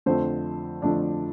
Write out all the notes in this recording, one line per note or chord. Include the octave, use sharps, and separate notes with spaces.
F2 D3 F3 A3 C4 C5
F2 D3 F3 A3 D4 D5